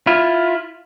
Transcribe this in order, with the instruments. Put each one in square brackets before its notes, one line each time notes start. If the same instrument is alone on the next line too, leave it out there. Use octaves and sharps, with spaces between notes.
[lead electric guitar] E4 F4